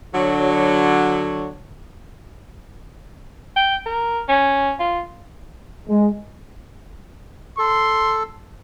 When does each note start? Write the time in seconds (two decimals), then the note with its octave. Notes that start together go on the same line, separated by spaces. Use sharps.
0.14 D3 F#3
3.56 G5
3.86 A#4
4.28 C#4
4.80 F4
5.88 G#3
7.59 A4 C6